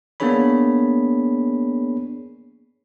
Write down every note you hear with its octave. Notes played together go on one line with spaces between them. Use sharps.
A#3 B3 D4 G#4 C#5 B5